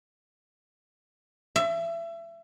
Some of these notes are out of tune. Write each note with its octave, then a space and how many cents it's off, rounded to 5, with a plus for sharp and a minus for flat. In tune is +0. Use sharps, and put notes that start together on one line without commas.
E5 +30